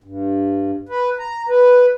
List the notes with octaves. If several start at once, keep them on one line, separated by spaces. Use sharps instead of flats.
G2
B4
A#5
B4